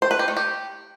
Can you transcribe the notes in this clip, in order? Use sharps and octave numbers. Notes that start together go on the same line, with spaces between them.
C5
B4
G4
A3
G4